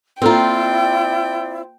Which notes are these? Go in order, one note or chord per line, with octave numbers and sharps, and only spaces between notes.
A#3 C4 E4 F4 A4 D5 G5 A#5